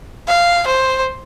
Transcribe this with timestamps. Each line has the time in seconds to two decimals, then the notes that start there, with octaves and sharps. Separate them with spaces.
0.28 F5
0.67 C5